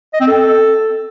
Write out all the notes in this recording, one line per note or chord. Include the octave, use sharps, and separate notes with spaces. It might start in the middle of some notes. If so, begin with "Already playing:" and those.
D#5
C4
A4